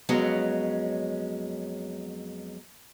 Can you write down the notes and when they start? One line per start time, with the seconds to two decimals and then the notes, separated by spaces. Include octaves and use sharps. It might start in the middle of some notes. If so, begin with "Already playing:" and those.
0.09 F2 F#3 G#3 B3 C#4